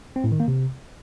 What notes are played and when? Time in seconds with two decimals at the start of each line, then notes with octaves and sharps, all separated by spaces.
0.16 C4
0.24 A2
0.32 D#3
0.40 A#3
0.48 C3